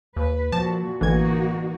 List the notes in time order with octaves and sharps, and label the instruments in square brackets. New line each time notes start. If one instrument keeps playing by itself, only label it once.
[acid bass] D#2 [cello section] B4
[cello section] A#2 F#4 [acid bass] F3 [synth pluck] A5
[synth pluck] A1 D3 G#6 [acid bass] E3 [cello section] A#3 D#4 F#4